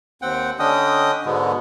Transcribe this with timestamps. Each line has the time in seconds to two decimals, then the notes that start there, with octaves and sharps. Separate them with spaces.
0.22 D#2 C4 F#5 G5
0.59 D3 C#4 D4 D#5 G5 D#6
1.26 G#2 B2 D3 G#3 B3